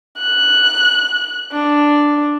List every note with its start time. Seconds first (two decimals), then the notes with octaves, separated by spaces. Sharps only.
0.18 F#6
1.52 D4